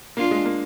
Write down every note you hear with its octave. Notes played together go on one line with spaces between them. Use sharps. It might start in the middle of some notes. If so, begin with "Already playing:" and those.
A#3 D4 F4
G#3
A#3